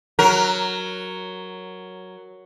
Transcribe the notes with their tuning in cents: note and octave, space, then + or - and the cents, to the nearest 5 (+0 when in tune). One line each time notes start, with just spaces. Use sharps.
F#3 +0 A#4 +0